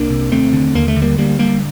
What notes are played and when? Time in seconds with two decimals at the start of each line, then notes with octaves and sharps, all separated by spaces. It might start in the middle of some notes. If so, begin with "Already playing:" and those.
Already playing: C2 A#3 D4
0.10 C3
0.31 D#2 A3 C4
0.53 D3
0.75 D#2 A#3
0.88 A3
0.96 D3
1.02 G3 A#3
1.18 D2 G3 A#3
1.39 D3 G3 A#3